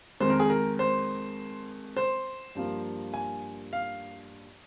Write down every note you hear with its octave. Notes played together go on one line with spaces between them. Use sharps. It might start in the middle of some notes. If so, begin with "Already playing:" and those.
F2 D#3 G#3 C5
A#4
G#4
A#4
C5
C5
G2 F3 A#3
G#5
F5